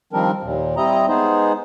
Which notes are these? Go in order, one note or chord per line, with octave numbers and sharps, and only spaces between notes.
D#3 F3 G3 C4 D4 A#4
D#2 A#2
G3 C4 E4 D#5 A#5
G#3 B3 D#4 G#4 C5